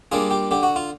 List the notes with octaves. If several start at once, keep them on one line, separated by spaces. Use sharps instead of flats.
G3 A#3 D4 F4 G#4
G4
D3 G4
F#4
F4